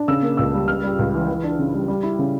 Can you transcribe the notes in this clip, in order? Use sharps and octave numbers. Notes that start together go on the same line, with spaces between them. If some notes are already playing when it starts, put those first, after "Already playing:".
Already playing: D4
C#3 E6
A#3
C#2 E6
G3
C#3 F6
G3
C#2
E3
E3
D4
C#3
G3
G3
E4
C#3